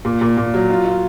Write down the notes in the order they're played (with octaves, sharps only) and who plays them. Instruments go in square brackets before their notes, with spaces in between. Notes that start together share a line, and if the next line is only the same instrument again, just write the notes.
[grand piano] A#2
A#2
A#2
F#3
F4
F4